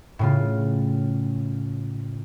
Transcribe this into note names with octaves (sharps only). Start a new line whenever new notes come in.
A2 C#3 F4